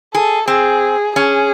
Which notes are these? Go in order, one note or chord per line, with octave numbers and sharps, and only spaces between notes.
G#4 A4
C4 G#4
C#4 G#4